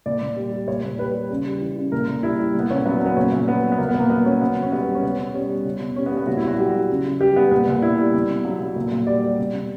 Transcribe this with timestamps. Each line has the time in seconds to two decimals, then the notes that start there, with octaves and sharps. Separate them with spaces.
0.06 A#2 D5
0.21 A#2
0.36 G3
0.52 G3
0.68 A#2 C#5
0.83 A#2
0.99 G3 B4
1.14 G3
1.30 C#3
1.46 G3
1.61 E3
1.77 C#3
1.92 A#2 A#4
2.08 A#2
2.23 G3 E4
2.39 G3
2.55 A#2 B3
2.70 A#2 C#4
2.86 F#3 B3
3.01 F#3
3.06 B3
3.16 A#2 C#4
3.32 A#2
3.48 F#3 B3
3.63 F#3
3.72 B3
3.78 A#2 A#3
3.89 B3
3.94 A#2
4.00 A#3
4.10 F#3 B3
4.25 F#3 C#4
4.41 B2 B3
4.56 B2
4.62 C#4
4.72 G3 B3
4.88 G3
4.95 C#4
5.02 B2 B3
5.19 B2
5.34 G3 C#4
5.49 G3
5.65 B2
5.81 B2
5.96 G3 C#4
6.06 B3
6.11 G3
6.17 B3
6.27 A#2 F#4
6.37 E4
6.43 A#2 F#4
6.59 F#3 G4
6.74 F#3
6.89 C#3
7.05 C#3
7.20 G3 G4
7.36 G3 B3
7.51 A#2 B3
7.67 A#2
7.82 G3 E4
7.98 G3
8.13 B2
8.29 B2
8.45 F#3
8.61 F#3
8.76 A#2
8.91 A#2
9.07 G3 D5
9.23 G3
9.38 B2
9.53 B2